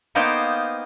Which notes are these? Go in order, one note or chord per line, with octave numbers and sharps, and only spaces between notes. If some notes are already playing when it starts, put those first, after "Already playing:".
A#3 B3 D#4 C5 F5 G5